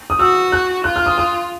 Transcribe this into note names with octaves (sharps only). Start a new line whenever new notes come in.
D#6
F#4 E6
F#6
F4 F#6
F6
D#6
D#6